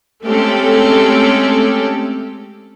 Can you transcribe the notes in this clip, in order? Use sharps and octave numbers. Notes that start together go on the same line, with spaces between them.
G#3 A3 C4 C#4 G4 A4